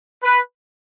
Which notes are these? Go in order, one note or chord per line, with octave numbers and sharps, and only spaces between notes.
B4